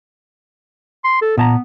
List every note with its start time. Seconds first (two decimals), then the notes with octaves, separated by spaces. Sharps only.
1.04 C6
1.22 A4
1.37 A#2 B3 A5 A#5